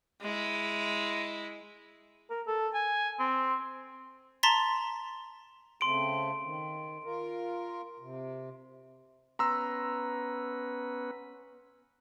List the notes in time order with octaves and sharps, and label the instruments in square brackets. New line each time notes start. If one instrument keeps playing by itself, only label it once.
[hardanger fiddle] G#3 E4
[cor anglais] A#4
A4
G#5
C4
[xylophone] A5 A#5 C6 A6 B6
[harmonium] C#3 A3 C4 [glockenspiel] C6 D7
[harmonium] D#3
F4 A#4
C3
[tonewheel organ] B3 C#4 B4 [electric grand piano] A#5 C6 E6